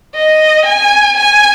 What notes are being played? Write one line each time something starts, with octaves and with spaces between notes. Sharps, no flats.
D#5
G#5
G#5